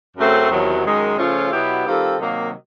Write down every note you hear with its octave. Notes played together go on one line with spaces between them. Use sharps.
F#2 C#3 F#3 A3 C4
E2 C3 D#3 F#3
F#2 D#3 G#3
C#3 F3 A3 C#4 F4
B2 F#3 B3 E4 G4
D#3 G3 C4 F4 A4
C3 D#3 F#3 A#3